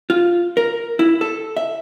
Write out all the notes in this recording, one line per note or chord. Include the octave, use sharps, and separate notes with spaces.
F4
A#4
E4
A4
E5